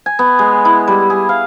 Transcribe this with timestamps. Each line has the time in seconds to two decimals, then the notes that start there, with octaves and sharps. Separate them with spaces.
0.06 G#5
0.19 B3
0.39 G#3
0.65 E4
0.88 G3
1.10 G#4
1.29 F5